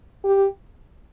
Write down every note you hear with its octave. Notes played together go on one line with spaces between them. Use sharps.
G4